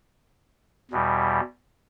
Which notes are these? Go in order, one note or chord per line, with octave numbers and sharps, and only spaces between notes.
E2 B2 G3